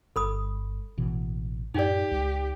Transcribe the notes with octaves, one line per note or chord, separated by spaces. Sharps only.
G1 A4 B5 D#6
A1 B2 E3
F#2 A2 D#4 G4 D5
C#2